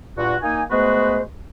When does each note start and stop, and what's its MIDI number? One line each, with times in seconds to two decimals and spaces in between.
0.18 0.37 43
0.18 0.37 46
0.18 0.37 65
0.18 0.37 66
0.43 0.63 58
0.43 0.63 63
0.43 0.63 80
0.70 1.20 56
0.70 1.20 57
0.70 1.20 59
0.70 1.20 66
0.70 1.20 71
0.70 1.20 72